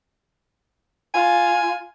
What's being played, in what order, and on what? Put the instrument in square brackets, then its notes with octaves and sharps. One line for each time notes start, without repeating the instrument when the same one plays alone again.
[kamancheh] F4 [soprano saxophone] G#5